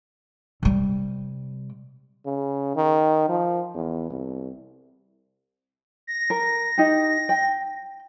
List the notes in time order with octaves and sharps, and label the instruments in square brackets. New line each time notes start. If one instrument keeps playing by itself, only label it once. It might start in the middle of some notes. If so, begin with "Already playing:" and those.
[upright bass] C3 G3
[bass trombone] C#3
D#3
F3
E2
C2
[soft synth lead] A#6
[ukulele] A#4
D#4 G4
G5